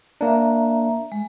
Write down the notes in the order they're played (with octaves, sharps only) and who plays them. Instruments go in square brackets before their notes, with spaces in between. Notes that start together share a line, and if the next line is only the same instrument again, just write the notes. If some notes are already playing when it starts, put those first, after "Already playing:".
[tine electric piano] A#3 D4 [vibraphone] E5 A#5
[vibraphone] G#3